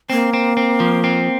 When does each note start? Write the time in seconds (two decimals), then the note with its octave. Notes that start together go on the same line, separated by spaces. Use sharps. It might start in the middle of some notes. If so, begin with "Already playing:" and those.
0.10 A#3 C4
0.33 C4
0.57 C4
0.80 F3
1.04 C4